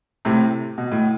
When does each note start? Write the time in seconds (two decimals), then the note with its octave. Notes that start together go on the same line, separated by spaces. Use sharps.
0.25 A2 C3
0.78 B2
0.91 A2